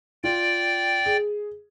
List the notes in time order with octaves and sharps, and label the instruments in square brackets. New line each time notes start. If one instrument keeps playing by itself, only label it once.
[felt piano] F4 [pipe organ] D5 G5
[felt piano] G#4